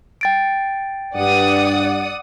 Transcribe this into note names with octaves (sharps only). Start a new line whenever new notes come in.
G5 A6 D7
G2 D5 F#5 D#6